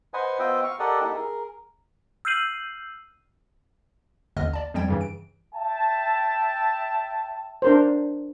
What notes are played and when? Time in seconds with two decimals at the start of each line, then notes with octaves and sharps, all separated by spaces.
0.14 B4 C5 D#5 F#5 G#5
0.39 B3 F4 C5 D#5 E5 G5
0.63 F5 C#6
0.79 G4 A4 A#4 D5 D#5 F#5
1.01 A#3 D#4 E4 G4 A4
1.15 G#4 A#4
2.25 E6 F6 G6 C7 D#7 F#7
4.37 A1 D#2 D3 D#5 F6
4.53 D5 A5
4.74 F2 F3 G3 G5 G#6 A6
4.89 G2 C#3 E3
5.01 D7
5.55 E5 G5 A5
7.62 D4 A#4 C5